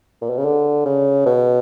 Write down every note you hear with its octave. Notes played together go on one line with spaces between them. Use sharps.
A#2
B2
C#3
D3
C#3
B2